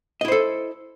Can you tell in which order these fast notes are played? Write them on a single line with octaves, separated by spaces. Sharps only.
D#5 E4 C5 A4